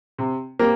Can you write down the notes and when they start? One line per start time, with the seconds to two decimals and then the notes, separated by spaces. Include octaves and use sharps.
0.19 C3
0.59 G3 A#3